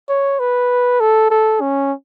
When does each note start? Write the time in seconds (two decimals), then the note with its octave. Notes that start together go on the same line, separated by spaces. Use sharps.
0.09 C#5
0.40 B4
1.00 A4
1.30 A4
1.61 C#4